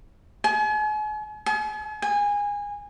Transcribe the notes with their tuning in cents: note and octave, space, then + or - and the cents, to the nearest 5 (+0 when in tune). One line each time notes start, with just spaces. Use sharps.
G#5 +40
G#5 +45
G#5 -20